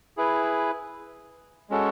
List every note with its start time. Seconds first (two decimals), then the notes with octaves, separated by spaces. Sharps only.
0.17 E4 G#4 B4
1.70 G#3 C#4 F#4 A4